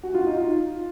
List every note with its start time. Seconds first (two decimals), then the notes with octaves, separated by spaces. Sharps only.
0.03 F#4
0.14 F4
0.27 D#4
0.37 F4